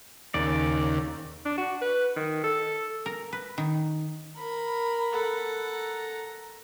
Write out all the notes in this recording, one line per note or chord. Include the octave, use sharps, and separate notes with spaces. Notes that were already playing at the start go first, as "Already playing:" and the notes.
D#2 C#3 D5
D4
F#4
B4
D#3
A4
A#4
B4
D#3
A#4 B5
A4 F#5
A#5